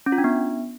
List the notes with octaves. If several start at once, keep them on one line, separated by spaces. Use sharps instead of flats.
C#4
F4
D4
B3